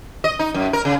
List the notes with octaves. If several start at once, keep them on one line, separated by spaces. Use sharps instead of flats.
D#5
D#4
F#2
A#4
C#3